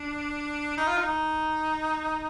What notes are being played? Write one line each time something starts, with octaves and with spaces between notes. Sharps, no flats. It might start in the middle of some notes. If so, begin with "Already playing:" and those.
Already playing: D4
D#4
F4
D#4